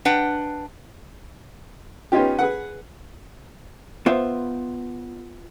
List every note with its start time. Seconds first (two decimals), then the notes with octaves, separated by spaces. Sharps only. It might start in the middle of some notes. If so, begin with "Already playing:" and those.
0.05 D4 B4 F#5 G5
2.12 B3 C#4 D#4 F4 G4
2.39 G#4 B4 F#5
4.06 B3 F4 C5 E5